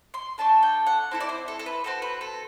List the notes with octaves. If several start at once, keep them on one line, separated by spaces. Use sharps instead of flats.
C6
A3 D4 A4 A5
G5
F#5
C4 E4 A4
D5
C5
A4
A4
B4
C4 F#4 A4
B4
A4